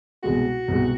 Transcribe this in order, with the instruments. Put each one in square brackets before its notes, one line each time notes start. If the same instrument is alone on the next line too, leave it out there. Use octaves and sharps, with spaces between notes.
[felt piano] C2 B2 G#3 [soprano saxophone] F#4
[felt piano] C2 B2 G#3